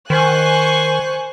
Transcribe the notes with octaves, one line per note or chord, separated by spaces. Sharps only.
D#3 C5 G#5 C#6 F#6